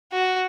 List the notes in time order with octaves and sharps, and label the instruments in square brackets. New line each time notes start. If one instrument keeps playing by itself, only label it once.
[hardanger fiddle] F#4